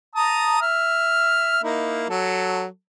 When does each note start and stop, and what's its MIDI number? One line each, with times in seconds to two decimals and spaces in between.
0.15 0.61 81
0.15 0.61 82
0.15 0.61 87
0.62 1.62 76
0.62 1.62 89
1.63 2.07 58
1.63 2.07 63
1.63 2.07 64
2.09 2.65 54
2.09 2.65 69